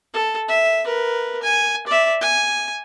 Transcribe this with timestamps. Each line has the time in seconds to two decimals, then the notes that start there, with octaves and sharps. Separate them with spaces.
0.14 A4
0.48 E5
0.85 A#4 B4
1.42 G#5
1.87 D5 E5
2.21 G#5